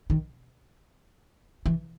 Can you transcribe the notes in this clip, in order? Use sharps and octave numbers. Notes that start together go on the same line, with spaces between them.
D#3
E3